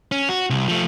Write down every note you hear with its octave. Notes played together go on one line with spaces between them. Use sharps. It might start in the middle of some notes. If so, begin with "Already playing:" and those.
C#4
F#4
C2
F3 A3